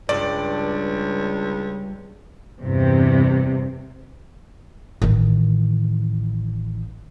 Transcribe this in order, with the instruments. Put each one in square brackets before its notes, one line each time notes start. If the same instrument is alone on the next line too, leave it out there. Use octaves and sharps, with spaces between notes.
[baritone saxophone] C#2 [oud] G2 [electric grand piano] D5
[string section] E2 G2 C3
[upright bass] A1 D#3